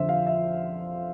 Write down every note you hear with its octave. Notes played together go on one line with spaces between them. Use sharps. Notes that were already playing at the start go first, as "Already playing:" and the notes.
Already playing: F2 D3 F3 C5 E5
F5
E5